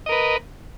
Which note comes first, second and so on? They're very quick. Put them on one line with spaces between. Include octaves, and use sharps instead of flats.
D#5 A#4 B4